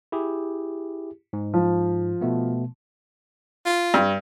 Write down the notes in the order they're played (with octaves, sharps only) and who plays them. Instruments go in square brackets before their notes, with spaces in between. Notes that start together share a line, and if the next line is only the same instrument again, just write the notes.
[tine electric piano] E4 G4 G#4
G#2
[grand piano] F3
[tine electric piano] B2 A3 B3
[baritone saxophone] F4
[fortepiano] G2